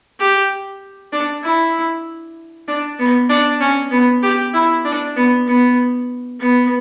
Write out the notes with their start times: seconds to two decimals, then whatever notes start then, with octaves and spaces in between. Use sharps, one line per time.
0.20 G4
1.12 D4
1.44 E4
2.68 D4
2.99 B3
3.29 D4
3.61 C#4
3.91 B3
4.23 G4
4.54 E4
4.85 D4
5.16 B3
5.47 B3
6.40 B3